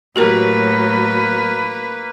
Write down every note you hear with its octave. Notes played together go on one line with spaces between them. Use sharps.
A2 F#3 A#3 F#4 G4 A#4 B4